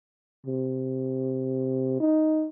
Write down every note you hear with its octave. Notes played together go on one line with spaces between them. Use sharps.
C3
D#4